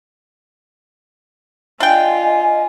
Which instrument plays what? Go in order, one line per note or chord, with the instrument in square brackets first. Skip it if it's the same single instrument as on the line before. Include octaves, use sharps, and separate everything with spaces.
[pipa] D4 G5 [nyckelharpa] F4 [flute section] D#5 G#5